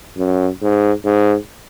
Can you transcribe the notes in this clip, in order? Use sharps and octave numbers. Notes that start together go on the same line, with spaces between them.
F#2
G#2
G#2